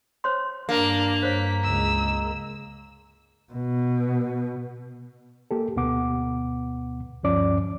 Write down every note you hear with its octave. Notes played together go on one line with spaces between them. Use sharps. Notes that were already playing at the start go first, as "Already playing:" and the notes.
C5 C#5 C6
G2 A#3 D4
G2 C5 C#5 B6
C#2 G#3 E6
B2
A#3 G4 A4
D2 B2 B3 F#5 D6
D2 G2 F3 C#4 D5 D6